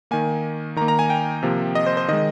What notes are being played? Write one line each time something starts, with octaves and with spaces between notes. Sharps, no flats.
D#3 A#3 G#5
D#3 A#5
A#3
A#5
G#5
G5
C3 F3 A#3
D#5
C5
C5
D#3 G#3 D#5